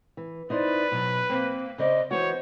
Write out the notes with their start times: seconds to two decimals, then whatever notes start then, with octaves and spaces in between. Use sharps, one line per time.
0.17 E3
0.50 D#4 E4 B4 C5 D5
0.92 B2 F#3
1.30 A#3 C4
1.78 C#3 C5 D5 D#5
2.11 E3 B3 F#4 C5 C#5